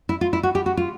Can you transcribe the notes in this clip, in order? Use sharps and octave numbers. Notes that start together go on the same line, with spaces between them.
E4
F4
E4
F#4
G4
F#4
F4